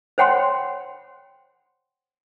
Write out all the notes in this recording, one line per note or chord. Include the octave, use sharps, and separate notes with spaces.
C5 C#5 F#5 G5 B5 C6